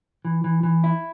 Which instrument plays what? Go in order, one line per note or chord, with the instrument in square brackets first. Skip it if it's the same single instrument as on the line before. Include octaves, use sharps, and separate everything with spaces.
[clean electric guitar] E3
E3
E3
E4